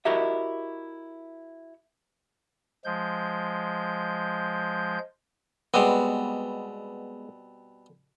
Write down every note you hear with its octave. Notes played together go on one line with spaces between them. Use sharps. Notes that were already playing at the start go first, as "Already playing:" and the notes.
E4 F#4 G4 A#4 D#5 E5
F3 G#3 G6
B2 G3 G#3 B3 C4